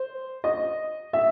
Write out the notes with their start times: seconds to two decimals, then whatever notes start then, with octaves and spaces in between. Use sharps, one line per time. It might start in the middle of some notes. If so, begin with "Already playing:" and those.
Already playing: C5
0.44 D#5
1.13 E5